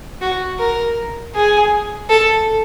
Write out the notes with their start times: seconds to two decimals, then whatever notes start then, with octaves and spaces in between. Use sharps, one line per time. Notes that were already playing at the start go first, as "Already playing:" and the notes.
0.21 F#4
0.59 A#4
1.35 G#4
2.09 A4